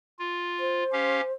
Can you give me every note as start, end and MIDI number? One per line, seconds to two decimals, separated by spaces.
0.19 0.83 65
0.60 1.33 72
0.92 1.21 61
0.92 1.21 67
0.92 1.21 77